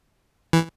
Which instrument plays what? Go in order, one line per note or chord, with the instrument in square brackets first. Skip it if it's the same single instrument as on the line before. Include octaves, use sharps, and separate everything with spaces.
[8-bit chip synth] E3